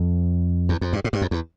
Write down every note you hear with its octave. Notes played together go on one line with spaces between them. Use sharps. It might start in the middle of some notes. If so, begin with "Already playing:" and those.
Already playing: F2
E2
F2
G2
A2
G2
F2
E2